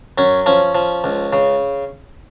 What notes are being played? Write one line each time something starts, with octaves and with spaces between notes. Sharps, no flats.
F#2 C#4
F3 C#4
F3
C#2
C#3